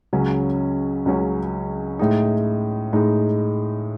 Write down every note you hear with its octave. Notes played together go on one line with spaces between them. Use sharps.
C#2 C#3 F#3 C#4
C#2 C#3 F#3 C#4
A2 G#3 D#4
A2 G#3 D#4